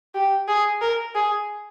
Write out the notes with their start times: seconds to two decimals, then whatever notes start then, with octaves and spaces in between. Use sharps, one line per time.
0.14 G4
0.48 G#4
0.82 A#4
1.16 G#4